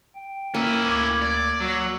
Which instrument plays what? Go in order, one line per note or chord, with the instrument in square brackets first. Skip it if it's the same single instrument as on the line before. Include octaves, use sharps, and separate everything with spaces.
[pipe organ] G5
[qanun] A#3 [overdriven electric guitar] C#4 E4
[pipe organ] D2 D6 G#6
[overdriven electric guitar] D5
[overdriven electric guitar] F#3 [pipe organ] E6